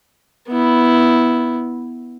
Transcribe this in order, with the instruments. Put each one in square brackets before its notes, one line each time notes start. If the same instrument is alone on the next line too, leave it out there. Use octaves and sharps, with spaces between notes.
[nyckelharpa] B3 E4